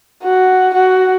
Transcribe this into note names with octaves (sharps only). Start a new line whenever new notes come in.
F#4
F#4